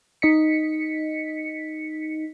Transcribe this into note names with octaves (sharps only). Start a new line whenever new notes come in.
D#4 D#5 B6 C#7